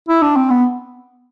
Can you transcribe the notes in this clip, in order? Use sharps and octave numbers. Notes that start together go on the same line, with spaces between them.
E4
D4
C4
B3